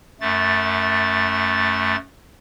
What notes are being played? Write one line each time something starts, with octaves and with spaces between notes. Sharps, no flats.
F#2 A3 A6